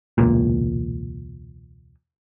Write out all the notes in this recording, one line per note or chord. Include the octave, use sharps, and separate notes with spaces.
E1 C#2 A#2